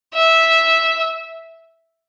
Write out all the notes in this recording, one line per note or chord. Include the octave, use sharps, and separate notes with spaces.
E5